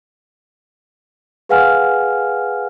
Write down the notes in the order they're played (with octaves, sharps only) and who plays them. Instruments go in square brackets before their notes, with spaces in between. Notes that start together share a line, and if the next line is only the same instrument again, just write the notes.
[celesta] G#4 B4 F5 F#5 G#5 F6